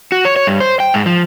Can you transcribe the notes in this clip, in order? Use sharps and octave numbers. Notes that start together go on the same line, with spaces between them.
F#4
C#5
C#5
G2
C5
G5
G#2
F3